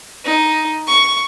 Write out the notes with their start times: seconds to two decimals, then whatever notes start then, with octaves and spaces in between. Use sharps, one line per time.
0.24 D#4
0.87 C#6